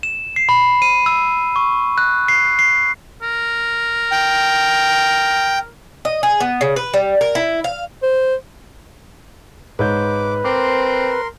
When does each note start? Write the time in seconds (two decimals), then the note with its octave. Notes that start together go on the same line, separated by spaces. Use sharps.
0.03 E7
0.36 C7
0.49 B5
0.82 D#7
1.06 E6
1.56 C#6
1.98 F#6
2.28 C7
2.59 C7
3.22 A#4
4.11 G5
6.05 D#5
6.23 G#4
6.40 B3
6.61 C#3
6.76 B4
6.94 G3
7.21 A#4
7.35 E4
7.64 F5
8.03 C5
9.79 G#2 B4 C#5 D6 G6
10.44 C4 A#4 C6 D6